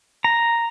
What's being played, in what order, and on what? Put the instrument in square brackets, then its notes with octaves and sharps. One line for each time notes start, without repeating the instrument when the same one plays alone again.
[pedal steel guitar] A#5